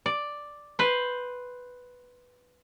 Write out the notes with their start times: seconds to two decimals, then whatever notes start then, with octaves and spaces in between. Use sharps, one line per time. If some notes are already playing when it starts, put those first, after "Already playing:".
0.06 D5
0.79 B4 C5